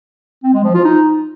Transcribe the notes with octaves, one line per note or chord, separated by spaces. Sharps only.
C4
G#3
F3
F4
D#4